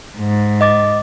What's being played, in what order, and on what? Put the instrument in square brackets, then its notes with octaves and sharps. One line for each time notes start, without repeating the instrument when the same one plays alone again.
[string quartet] G#2
[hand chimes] D#5 D6 A6